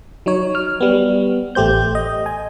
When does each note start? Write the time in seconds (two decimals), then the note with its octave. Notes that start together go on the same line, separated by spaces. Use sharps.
0.26 F#3 D#4 C#5
0.55 F6
0.81 G3 B3
1.55 A1 A3 G4 C5 G6
1.95 D#5
2.26 G#5